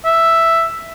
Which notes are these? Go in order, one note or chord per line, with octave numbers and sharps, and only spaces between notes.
E5